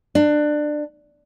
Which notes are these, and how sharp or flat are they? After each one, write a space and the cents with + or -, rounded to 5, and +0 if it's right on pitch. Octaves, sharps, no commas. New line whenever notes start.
D4 +20